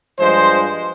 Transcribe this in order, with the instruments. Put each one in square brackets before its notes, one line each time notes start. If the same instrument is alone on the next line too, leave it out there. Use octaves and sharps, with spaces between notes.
[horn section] G2 F3 G#3 C5